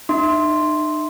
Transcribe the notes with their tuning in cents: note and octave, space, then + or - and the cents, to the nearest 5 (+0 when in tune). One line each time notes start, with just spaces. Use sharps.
D#4 -40 E5 +0 C6 +0